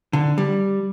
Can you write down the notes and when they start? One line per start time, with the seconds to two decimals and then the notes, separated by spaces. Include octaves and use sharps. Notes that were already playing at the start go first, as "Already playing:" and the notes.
0.13 D3
0.38 G3